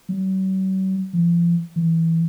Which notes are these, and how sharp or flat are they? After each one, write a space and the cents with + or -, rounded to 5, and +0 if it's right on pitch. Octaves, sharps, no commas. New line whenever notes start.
F#3 +45
F3 -35
E3 -5